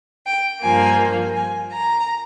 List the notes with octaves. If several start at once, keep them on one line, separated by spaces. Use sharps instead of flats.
G5
G2 F3 A#3 G#5
G#5
A#5